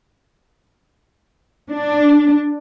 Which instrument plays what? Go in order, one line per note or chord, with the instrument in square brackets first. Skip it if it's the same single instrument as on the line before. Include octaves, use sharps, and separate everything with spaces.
[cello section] D4